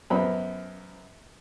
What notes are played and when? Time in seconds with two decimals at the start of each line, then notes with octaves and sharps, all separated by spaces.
0.10 F#2 F3 B3 B5